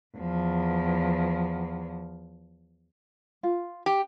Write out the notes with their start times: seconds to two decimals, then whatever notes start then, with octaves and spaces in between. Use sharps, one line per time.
0.17 E2 F3
3.43 F4
3.86 G4